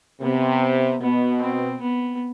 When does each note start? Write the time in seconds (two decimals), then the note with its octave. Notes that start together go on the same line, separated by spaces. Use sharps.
0.21 C3 B3
1.01 B2 B3
1.41 C4
1.81 B3